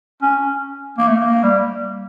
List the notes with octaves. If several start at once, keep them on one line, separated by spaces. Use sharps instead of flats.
C#4
A#3
A3
A#3
G3